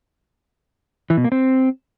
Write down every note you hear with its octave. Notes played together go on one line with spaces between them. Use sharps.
E3
B2
A#3
C4